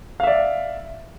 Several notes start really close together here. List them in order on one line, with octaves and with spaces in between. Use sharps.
F5 E5 D5